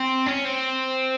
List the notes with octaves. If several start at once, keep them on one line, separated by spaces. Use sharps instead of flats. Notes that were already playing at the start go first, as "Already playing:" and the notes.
Already playing: C4
C#4
C4